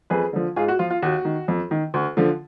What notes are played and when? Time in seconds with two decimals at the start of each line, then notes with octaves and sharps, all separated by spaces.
0.10 F2 G#4 B4
0.33 D3 F3
0.56 G#2 F4 G#4
0.68 F#4
0.79 F3 F4
0.90 F4
1.02 D#2 F#4
1.25 D#3
1.48 F2
1.71 D#3
1.94 D2
2.17 D3 F3